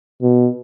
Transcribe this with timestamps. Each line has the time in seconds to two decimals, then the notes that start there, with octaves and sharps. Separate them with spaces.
0.22 B2